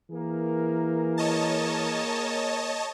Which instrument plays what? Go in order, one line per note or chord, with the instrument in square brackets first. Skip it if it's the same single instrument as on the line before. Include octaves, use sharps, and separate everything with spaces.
[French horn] E3 [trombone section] A#3 G#4 A#4
[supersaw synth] C#5 D#5 A5